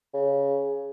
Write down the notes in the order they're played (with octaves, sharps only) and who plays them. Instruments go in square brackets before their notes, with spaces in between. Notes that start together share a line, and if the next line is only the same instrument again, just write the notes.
[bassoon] C#3